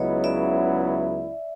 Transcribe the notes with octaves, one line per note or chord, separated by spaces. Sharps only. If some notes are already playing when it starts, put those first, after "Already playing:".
Already playing: C#2 C#3 F#3 B3 E4 C#5 D#5
D5 E5